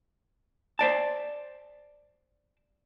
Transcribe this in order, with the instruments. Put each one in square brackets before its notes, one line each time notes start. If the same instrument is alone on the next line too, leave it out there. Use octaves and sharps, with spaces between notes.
[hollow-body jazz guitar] C5 D5 A5